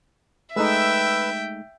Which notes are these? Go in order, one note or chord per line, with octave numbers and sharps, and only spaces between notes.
G#3 A3 D#4 B4 E5 G5 E6